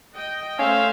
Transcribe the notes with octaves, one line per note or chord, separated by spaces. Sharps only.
D#5 G5
A3 C#4 C5 E5 F5